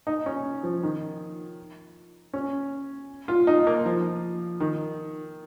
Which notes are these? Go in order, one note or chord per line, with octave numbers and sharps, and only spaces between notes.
D#4
C#4
F3
D#3
C#4
F4
D#4
A#3
F3
D#3